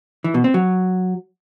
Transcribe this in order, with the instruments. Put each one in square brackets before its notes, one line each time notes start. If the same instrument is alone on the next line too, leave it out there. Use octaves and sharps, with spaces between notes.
[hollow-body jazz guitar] E3
B2
C4
F#3